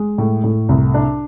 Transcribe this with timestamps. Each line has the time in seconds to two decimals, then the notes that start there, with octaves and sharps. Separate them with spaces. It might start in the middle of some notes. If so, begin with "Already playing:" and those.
Already playing: G#3
0.18 A2
0.44 A2
0.69 C2
0.94 D4